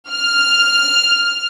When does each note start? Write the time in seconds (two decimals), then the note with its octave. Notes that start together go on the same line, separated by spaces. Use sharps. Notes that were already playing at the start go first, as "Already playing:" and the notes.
0.11 F6